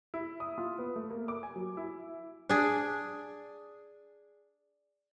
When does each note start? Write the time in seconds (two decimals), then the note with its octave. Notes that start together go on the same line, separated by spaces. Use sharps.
0.14 E4
0.40 D#6
0.58 F4
0.78 B3
0.96 A3
1.11 A#3
1.28 D6
1.43 G#5
1.56 F#3
1.77 E4
2.49 D4 G#4